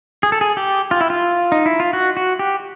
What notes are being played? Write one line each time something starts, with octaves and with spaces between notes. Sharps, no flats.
G#4
A4
G#4
G4
F4
E4
F4
D#4
E4
F4
F#4
F#4
G4